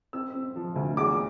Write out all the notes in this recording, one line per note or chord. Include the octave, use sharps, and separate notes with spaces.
C4 E6
C4
F3
D2
E2 D6